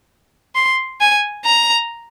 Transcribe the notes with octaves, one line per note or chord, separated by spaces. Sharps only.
C6
G#5
A#5